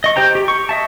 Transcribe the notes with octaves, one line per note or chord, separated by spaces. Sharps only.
D#5 C#6
G4 C5 G5 A#5
G4
C#6
D#5 E5 A5